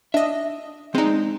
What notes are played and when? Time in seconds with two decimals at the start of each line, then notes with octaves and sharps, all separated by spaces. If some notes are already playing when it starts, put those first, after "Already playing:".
0.14 D4 D#5 E5
0.95 G#3 C4 D4 D#4